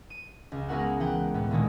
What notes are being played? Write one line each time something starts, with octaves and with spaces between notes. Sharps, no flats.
D#7
C#2
G#3 B3 E4 F#4 A#4 F#5
E3 F#5 G5
A2 B3
A#2 D3 D#3 G3 G#3